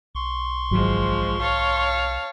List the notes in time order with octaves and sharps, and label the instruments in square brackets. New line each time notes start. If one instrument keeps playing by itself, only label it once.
[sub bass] B1 [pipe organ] C6 C#6
[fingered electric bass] G#1 F#3 [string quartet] F3 G#3
[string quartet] C#5 F5 A5